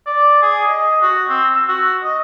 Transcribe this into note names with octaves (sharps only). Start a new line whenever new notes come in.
D5
G#4
D#5
F#4
C4
E6
F#4
D#5